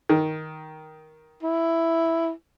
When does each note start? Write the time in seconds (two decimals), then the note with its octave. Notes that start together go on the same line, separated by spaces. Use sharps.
0.09 D#3
1.43 E4